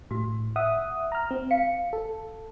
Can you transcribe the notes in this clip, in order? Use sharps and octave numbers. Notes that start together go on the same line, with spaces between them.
A2 F#4
E5 F#5 D#6
A#5 F6
C4
F5 C#7
A4